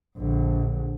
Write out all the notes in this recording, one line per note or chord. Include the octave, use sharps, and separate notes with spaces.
A#1 D3